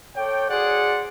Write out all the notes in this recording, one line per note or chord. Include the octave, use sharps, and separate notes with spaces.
A4 C#5 D5 G5
F#4 G#4 C5 D5 F#5